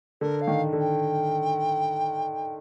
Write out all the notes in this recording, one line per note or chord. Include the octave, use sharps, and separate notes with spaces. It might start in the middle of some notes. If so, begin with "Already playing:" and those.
D3 A#4
F5
D#3
D3
G5